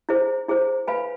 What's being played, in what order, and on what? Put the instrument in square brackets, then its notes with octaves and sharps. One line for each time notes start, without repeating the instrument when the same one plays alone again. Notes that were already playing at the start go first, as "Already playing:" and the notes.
[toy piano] E4 G#4 C5
E4 G#4 C5
B4 F5 G#5 B5